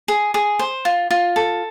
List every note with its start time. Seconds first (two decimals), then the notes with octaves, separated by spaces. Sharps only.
0.08 G#4
0.34 G#4
0.59 C5
0.85 F4
1.11 F4
1.36 A4